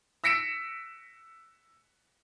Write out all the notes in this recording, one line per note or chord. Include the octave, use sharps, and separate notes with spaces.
E6 A#6 B6 C#7 D7 E7